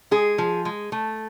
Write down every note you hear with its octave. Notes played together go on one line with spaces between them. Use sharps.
G#3 G#4
F3
G#3
A3